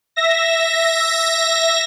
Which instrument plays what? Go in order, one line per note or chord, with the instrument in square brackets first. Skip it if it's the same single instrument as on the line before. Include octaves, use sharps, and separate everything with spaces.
[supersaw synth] E5 A#6